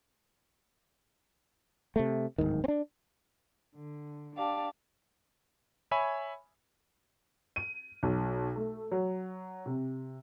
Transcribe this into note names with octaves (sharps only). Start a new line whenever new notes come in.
C3 A3
D1 A#1 G#2 D#3
C4 D4
D3
D4 G4 D5 F5 A5
C#5 E5 G#5 B5
D#7
B1
A3
F#3
C3